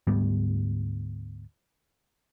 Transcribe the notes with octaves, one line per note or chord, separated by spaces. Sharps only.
D2 G#2 G3 B3